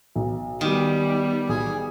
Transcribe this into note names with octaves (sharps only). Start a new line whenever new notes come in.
B1
D#3 G3 B3 G4
B1 G#4